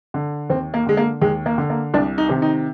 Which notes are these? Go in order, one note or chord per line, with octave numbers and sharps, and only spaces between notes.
D3
D#2 C4
A#3
D3 G#3
A#3
D#2 G#3
A#3
D3
A#3
C2 D4
D#4
C3 D#3
D#4